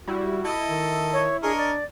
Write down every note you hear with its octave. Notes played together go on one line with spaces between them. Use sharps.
G3 E4 F#4
E4 A4 D#5
D#3
C#5
D4 G#4 A#4 C#5 D#5
D5